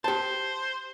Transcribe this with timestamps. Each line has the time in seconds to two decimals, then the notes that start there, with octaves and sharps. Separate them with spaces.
0.04 G4 C5 A5